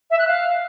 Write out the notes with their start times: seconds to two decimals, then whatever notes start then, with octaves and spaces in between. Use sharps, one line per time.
0.11 E5
0.19 F#6
0.28 F5